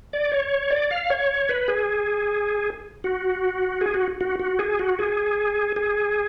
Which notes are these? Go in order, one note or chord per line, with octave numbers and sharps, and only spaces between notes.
D5
C#5
D5
F5
C#5
B4
G#4
F#4
G#4
F#4
F#4
F#4
G#4
F#4
G#4
G#4